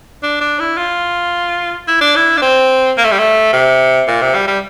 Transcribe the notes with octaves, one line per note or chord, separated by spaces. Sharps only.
D4
D4
E4
F4
E4
D4
E4
D4
C4
A#3
A3
G3
A3
C3
A#2
C3
G3
G3